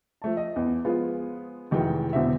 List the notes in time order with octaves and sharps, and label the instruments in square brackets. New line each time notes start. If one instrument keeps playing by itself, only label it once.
[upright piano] F3 A3 A5
D#5
E2
F3 G#3 B3 F4
F1 D#3 E3 G#3 F#4 G5
E1 E2 D3 C4 F#4 E5